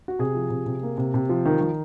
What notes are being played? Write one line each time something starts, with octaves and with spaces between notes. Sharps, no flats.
F#4
C3 G#4
F3
C3
C3
A#3
C3
C3
F3
D#3
D#3